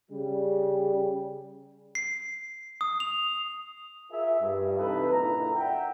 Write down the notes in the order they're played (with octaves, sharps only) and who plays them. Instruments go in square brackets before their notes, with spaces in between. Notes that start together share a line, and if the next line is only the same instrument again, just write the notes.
[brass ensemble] C#3 G3
[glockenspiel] C7
D#6
F7
[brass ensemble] F4 G#4 A#4 E5
G2
C3 E3 D#4 A4 B4
F#1 A#2 D3 E4 A#5
D5 E5 F#5 G5